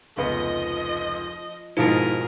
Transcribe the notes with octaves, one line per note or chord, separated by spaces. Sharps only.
F1 C#2 F3 B3 D#5
G#2 B2 F3 D#4 E4 A#4